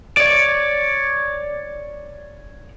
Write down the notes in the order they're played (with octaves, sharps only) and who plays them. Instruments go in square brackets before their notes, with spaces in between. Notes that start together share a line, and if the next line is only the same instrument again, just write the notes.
[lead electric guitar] C#5 D5